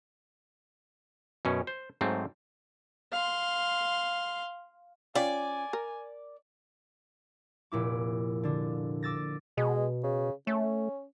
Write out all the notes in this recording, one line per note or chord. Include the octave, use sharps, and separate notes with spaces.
F#2 B2 C#4
C5
G#2 F#3 A3 C4
F5 C6
C#4 F4 D5 G5 G#5
A#4
F1 A#2 E4 D6
D3 D4
D6 E6 A6 A#6
B2 G#3
C#3
A3 C#4